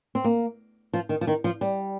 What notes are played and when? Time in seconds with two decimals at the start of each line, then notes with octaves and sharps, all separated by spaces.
0.15 C4
0.24 A#3
0.93 F3
1.09 D#3
1.21 F3
1.27 D#3
1.44 F3
1.61 G3